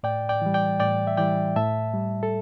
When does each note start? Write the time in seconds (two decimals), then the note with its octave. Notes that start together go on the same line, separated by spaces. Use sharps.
0.03 A2 D5 G5
0.29 D5 G5
0.42 E3 G3
0.54 D5 G5
0.80 A2 D5 G5
1.07 E5
1.17 E3 G3 D5 G5
1.56 A2 E5 A5
1.93 G3
2.23 A4